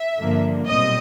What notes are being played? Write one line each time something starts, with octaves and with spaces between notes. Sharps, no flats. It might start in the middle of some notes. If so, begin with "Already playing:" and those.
Already playing: E5
G2 D3 F3 A#3 D4
B1 A#2 G3 C4 D#5